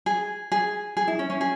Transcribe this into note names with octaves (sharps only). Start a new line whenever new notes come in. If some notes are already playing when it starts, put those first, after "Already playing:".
G#4
G#4
G#4
E4
C#4
C#4
G#4